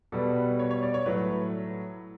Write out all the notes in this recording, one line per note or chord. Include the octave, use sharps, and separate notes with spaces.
B2 G3 B3 A4
B4
C#5
C#5
D5
C#5
A2 F#3 A3 B4